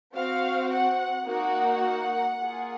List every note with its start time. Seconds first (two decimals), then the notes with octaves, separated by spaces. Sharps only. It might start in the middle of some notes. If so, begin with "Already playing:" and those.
0.14 C4 F#4 F5
0.70 F#5
1.26 A#3 D#4 F#4 F#5
2.40 A#3 F4 G#4